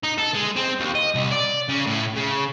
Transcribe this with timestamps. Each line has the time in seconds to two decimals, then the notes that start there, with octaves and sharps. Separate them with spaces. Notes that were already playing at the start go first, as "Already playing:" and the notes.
0.03 D#4
0.18 A4
0.34 G#3
0.56 C4
0.80 D#2
0.95 D#5
1.15 C2
1.31 D5
1.69 C#3
1.87 A2
2.16 C#3